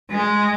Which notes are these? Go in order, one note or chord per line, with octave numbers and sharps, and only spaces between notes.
G#3